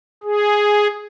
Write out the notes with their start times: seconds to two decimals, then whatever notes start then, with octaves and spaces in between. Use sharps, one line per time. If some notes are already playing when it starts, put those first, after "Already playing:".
0.23 G#4